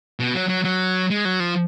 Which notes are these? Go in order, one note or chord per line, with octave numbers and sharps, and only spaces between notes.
B2
F#3
F#3
F#3
G#3
F#3
F3